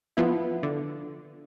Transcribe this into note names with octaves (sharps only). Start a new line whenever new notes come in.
F3 B3 E4
D3